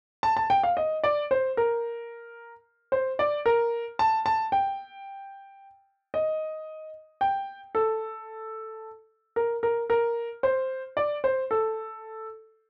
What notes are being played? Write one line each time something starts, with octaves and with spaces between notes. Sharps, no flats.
A5
A5
G5
F5
D#5
D5
C5
A#4
C5
D5
A#4
A5
A5
G5
D#5
G5
A4
A#4
A#4
A#4
C5
D5
C5
A4